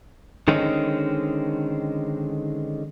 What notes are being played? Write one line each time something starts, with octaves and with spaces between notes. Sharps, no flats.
D3 D#3 G#3 C4 C#4 D#4